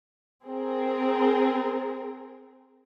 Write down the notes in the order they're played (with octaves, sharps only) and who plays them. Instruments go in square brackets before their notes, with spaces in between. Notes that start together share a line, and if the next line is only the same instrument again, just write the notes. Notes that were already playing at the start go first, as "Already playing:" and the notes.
[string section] C4 G#4 A#4